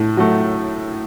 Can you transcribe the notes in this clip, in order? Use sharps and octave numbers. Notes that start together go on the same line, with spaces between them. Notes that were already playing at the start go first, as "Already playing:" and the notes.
Already playing: A2 A3
F#3 A3